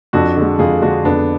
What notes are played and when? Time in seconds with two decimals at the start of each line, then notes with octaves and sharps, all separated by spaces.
0.13 F2 D4 F#4
0.36 D3 G#3
0.59 F2 F4 G#4
0.82 D3 G#3 D4 F#4
1.05 F2 B3 D4